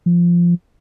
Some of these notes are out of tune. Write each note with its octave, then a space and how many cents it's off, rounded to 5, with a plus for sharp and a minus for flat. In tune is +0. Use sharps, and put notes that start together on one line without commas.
F3 -10